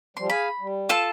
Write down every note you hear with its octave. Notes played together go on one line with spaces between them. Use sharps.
F3 G3 C6
G#4 F5 G#5 B5
G3
F4 A4 A5